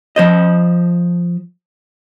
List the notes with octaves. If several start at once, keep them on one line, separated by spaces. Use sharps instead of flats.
F3 C5 D#5